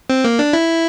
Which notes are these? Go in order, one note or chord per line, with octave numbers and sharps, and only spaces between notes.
C4
A#3
D4
E4